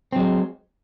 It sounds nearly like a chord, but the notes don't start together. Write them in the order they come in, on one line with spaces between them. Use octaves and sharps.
C4 F#3 G#3